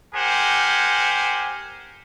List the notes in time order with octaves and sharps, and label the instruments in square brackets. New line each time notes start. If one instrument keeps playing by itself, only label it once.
[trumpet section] G4 A#4 C5 F#5 G#5